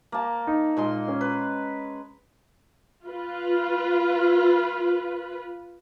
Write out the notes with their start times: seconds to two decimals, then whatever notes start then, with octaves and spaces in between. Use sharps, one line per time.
0.12 A#3 A5
0.47 D#4
0.77 A#2 G#3 C6
1.08 C#4
1.21 B4
3.06 F4 B4